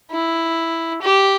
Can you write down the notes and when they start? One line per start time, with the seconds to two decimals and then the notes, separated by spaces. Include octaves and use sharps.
0.12 E4
1.02 G4